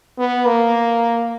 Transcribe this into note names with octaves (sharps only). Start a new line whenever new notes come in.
B3
A#3